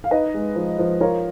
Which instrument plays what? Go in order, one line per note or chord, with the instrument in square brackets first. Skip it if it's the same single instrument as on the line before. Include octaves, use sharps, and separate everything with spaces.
[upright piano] F5
D#4 B4 D#5
G#3
F3
F3
F4 A#4 C#5